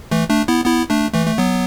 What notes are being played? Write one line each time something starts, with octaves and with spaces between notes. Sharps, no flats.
E3 A3
A3 D4
B3 E4
B3 E4
A3 D4
E3 A3
A3
F#3 B3